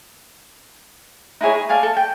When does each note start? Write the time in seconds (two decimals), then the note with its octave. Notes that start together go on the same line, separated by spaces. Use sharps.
1.41 D#4 E4 G#4 C#5
1.54 G#4
1.69 D5 F5 G#5 A5
1.83 A4
1.97 G5